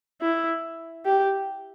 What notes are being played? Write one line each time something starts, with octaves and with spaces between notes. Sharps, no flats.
E4
G4